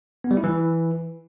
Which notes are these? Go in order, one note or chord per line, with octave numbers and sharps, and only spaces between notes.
B3
G3
E4
E3